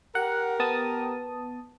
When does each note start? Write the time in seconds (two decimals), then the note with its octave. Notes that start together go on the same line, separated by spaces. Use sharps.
0.15 G4 A#4 F#5
0.60 B3 A5 D#6